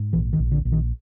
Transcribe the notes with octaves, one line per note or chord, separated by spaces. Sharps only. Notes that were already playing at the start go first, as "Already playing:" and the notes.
Already playing: G#2
A#1 E3
D#3
A#1
D3
A#1
D#3